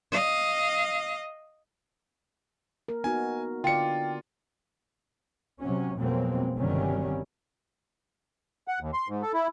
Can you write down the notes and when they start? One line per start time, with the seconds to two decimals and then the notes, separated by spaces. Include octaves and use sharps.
0.12 D#5 F5
2.88 A#3 A#4
3.04 B3 D#4 F#4 G#5
3.64 D3 F4 D5 G5 C#7
5.60 C3 F#3 C#4
5.97 F2 B2 F#3 G#3 A#3 C4
6.57 G1 C3 D#3 F#3 G3 C#4
8.68 F#5
8.80 D#2
8.93 C6
9.08 G#2
9.22 A4
9.34 E4